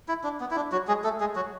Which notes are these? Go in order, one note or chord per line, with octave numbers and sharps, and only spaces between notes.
E4
D4
B3
E4
D4
F#3 F#4
G#3 G#4
A3 A4
G#3 G#4
F#3 F#4